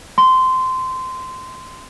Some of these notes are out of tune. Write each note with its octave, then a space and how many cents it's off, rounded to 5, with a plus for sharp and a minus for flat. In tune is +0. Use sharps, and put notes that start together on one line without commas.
C6 -15